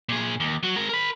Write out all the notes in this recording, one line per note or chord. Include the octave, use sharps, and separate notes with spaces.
A#2 G#4
D#2
F#3 F#4
G#3 A#4
A#4 B5